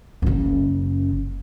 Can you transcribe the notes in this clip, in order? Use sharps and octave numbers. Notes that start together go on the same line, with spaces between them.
F#1 C#3